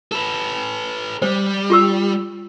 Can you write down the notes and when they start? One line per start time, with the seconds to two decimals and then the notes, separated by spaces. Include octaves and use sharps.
0.12 A4 B4
1.22 G3 C5
1.70 F4 G4 E6